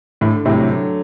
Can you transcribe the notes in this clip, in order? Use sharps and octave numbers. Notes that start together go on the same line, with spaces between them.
A2 D3
A2 C3 F#3 A3
D3